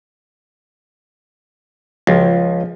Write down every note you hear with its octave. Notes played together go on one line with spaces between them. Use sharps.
C#2 F3